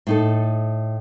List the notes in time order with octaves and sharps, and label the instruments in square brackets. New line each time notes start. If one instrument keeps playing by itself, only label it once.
[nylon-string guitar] A2 D#4 A4